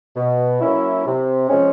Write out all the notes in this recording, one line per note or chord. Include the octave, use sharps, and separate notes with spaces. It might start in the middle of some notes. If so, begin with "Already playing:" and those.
B2
F#3 A#3 C#4 E4
C3
F3 G#3 C#4